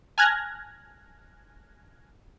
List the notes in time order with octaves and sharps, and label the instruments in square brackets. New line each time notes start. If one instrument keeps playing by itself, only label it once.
[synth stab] G#5 A5 F6 F#6 G#6 A#6